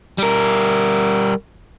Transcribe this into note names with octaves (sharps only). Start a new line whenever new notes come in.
G3 A#4